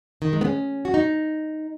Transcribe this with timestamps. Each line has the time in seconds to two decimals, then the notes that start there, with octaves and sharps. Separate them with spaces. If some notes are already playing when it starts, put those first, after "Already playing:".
0.22 D#3
0.33 G#3
0.41 B3
0.45 C#4
0.85 F#4
0.94 D#4